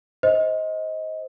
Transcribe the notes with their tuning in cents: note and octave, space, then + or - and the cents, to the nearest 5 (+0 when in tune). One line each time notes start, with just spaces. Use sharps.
C5 +0 D#5 +20